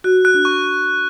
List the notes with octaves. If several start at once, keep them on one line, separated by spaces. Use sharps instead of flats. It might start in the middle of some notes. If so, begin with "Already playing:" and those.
F#4 F#6
F#6
D4
C#6